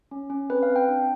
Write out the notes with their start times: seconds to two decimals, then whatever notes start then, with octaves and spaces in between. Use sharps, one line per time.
0.11 C#4
0.30 C#4
0.50 C4 B4
0.63 F5
0.70 C4
0.76 G5
0.89 D4